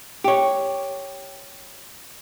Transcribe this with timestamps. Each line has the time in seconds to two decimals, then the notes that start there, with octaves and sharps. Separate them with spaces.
0.24 G4 C#5